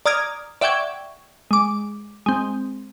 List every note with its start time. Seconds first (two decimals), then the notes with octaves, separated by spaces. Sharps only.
0.06 D5 A#5 D#6 F6 G#6
0.61 D5 E5 F#5 G5 C#6 G#6
1.51 G#3 D6
2.26 G#3 C4